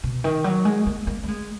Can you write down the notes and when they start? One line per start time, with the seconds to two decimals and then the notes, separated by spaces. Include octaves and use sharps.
0.04 B2
0.24 D#3
0.44 F#3
0.65 G#3
0.87 A#3
1.07 A#3
1.24 A#3
1.28 G#3